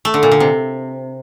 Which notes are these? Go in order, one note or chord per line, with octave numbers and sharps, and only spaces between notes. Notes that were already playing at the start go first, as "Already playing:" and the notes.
A3
D3
A#2
D3
C3